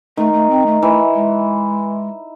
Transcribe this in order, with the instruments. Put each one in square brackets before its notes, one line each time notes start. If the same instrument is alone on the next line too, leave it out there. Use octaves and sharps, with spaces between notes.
[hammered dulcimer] D#3 [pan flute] A3
[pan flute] A3
C4
A3
[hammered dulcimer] E3 [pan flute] A3
[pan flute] G#3